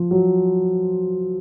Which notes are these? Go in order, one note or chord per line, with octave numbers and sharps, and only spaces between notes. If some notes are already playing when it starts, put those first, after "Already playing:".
Already playing: F3
F#3